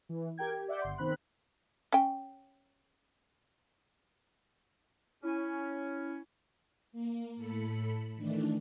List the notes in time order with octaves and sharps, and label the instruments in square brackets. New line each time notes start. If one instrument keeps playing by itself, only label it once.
[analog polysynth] E3
G4 A#4 G5 G#6
G4
D5 E5 F#5 D6 G6
G1 C6
B2 D#3 C4 B5 F#6
[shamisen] C#4 G5
[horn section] C#4 [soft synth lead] E4
[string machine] A#3
A2 A4 B5 C#7
D#3 E3 A3 D4